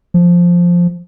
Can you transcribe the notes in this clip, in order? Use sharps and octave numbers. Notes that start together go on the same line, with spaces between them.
F3